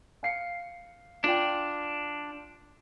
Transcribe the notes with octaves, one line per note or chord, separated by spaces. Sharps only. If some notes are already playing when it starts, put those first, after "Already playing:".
F5 C7 C#7
D4 F4 D5 G5